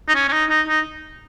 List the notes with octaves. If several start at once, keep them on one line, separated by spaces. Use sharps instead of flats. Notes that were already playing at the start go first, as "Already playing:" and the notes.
D#4
C#4
C#4
D#4
D#4
D#4